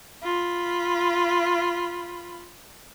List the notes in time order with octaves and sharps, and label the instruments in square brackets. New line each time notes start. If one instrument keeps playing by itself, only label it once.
[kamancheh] F4 B5